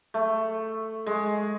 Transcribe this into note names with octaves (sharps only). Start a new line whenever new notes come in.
A3
G#3